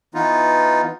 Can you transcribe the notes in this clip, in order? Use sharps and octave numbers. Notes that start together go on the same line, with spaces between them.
E3 B3 D#4 F4